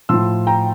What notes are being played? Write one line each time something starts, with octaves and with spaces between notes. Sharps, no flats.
A2 F3 C6 E6
G5 A#5